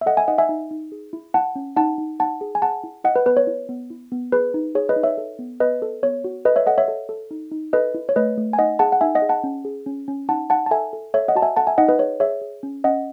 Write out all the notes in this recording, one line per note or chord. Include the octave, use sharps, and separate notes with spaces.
E5
A4 D#5 F#5
E5 G#5
D#4 D#5 F#5
E5 G#5
D#4
D#4
G#4
E4
E4 F#5 A5
C#4
D#4 F#5 A5
D#4
D#4 F#5 A5
G#4
G#5
G#4 F#5 A5
E4
E4 D#5 F#5
B4
B3 B4
C#5
E4
B3
E4
B3
G#4 B4
D#4
G#4 C#5
B4 D#5
D#4
C#5 E5
A4
B3
B3 B4 D#5
A4
B3 C#5
F#4
A4 B4 D#5
C#5 E5
A4 D#5 F#5
C#5 E5
A4
A4
D#4
D#4
A4 B4 D#5
E4
C#5
A3 B4 D#5
A3
G#5
D#4 D#5 F#5
G#4 F#5 A5
F#5
D#4 E5 G#5
D#5 F#5
G#4
F#5 A5
C#4
G#4
C#4
C#4
D#4 F#5 A5
D#4 F#5 A5
A5
A4 E5 G#5
A4
A4 C#5 E5
D#5 F#5
F#4 A5
E5 G#5
A4 F#5 A5
E5 G#5
D#4 D#5 F#5
B4 D#5
G#4 C#5
G#4 C#5 E5
G#4
C#4
C#4 D#5 F#5